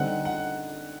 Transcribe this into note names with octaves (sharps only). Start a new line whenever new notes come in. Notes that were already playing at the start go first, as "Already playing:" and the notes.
Already playing: D3 G3 C4 D#4 F#5
F#5